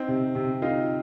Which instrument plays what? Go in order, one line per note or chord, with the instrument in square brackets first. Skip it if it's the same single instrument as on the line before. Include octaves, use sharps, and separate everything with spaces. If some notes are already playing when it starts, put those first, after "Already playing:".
Already playing: [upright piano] C4 [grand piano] D#4
[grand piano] C3
C3
[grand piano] D#4 [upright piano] F4